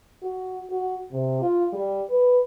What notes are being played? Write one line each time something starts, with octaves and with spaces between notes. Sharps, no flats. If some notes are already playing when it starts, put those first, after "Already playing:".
F#4
F#4
C3
F4
G3
B4